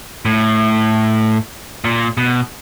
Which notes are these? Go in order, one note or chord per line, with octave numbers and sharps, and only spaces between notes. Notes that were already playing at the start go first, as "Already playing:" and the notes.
A2
A#2
B2